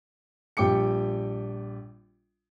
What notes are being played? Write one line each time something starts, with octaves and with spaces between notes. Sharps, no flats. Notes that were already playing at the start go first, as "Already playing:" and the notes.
A#1 G3 G5 D6 C#7